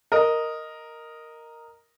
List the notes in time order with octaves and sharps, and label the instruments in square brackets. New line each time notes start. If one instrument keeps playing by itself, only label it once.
[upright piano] A#4 D#5